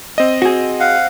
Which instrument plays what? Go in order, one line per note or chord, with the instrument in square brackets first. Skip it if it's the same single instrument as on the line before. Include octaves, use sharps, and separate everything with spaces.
[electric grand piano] C4 D#5
[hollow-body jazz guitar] F#4 G#4
[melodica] F5 F#5